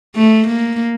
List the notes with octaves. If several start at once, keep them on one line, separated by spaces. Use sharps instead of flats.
A3
A#3